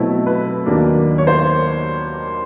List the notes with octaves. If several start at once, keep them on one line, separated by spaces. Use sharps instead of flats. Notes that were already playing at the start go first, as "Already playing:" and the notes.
Already playing: B2 F#3 A3 C4 E4
B4
D#2 D#3 F#3 A#3 D4
C#5
C5